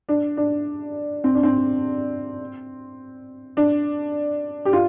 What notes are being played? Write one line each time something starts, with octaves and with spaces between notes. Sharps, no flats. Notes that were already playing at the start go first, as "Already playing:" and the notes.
D4
D4
C4
D4
C4
D4
G4
F4